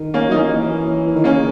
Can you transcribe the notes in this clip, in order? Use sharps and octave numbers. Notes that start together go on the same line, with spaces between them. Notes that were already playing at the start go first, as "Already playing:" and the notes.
Already playing: D#3
A#3 C#4
F#3
D#4
E3 A#3 C#4
E3
D#3
C#3 A#3 C#4